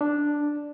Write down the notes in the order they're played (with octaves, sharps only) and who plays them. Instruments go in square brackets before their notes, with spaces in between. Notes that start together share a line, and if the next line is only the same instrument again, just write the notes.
[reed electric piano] D4